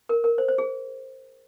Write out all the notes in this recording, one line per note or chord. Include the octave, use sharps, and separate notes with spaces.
A#4
A#4
C5
C5
G#4